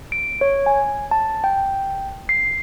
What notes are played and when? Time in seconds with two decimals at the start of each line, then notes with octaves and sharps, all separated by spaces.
0.12 D7
0.41 C#5
0.66 G#5
1.11 A5
1.44 G5
2.29 C7